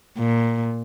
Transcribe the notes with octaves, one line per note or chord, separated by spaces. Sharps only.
A#2